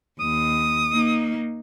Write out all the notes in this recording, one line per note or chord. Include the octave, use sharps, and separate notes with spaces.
D#2 D#6
A#3 D#4